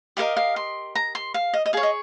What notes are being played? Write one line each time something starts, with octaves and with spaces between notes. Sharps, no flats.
G4 A#4 D#5 F5
F5
C6
A#5
C6
F5
D#5
D#5
G#4 C#5 F5
D#5